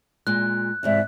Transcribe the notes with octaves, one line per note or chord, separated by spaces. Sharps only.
A#2 G#3 F#6
G#2 C3 E3 D5 E5